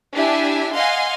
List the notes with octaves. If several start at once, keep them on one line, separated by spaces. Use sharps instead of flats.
D4 E4 G4 E5 G#5
D#5 F5 F#5 G#5 C6